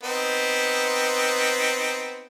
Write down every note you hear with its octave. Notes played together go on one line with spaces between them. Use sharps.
B3 C4 D#4